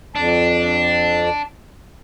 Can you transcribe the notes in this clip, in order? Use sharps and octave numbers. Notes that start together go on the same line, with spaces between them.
F2 D4 A5